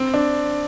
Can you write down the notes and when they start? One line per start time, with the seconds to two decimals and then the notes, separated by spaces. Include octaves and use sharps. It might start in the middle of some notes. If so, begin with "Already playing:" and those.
Already playing: C4
0.14 D4